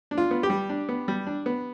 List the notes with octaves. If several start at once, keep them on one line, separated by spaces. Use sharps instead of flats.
D4
F4
B3
G4
G3
D4
B3
G3
D4
B3